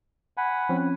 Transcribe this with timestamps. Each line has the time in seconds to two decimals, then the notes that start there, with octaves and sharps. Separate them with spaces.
0.37 F#5 G#5 B5
0.69 F3 C4 C#4